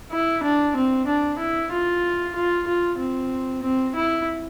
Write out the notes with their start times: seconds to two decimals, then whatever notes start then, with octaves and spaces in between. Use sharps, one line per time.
0.11 E4
0.43 D4
0.76 C4
1.07 D4
1.38 E4
1.72 F4
2.35 F4
2.67 F4
2.98 C4
3.62 C4
3.95 E4